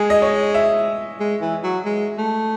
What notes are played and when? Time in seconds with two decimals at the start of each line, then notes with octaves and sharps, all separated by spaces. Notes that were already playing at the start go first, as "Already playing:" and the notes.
Already playing: G#3 G#4
0.10 D#5
0.22 C#5
0.54 E5
1.20 G#3
1.41 E3
1.63 F#3
1.85 G#3
2.18 A3